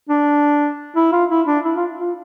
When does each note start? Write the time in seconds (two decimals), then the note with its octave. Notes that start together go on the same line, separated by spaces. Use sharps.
0.09 D4
0.96 E4
1.12 F4
1.30 E4
1.47 D4
1.64 E4
1.76 F4
1.99 F4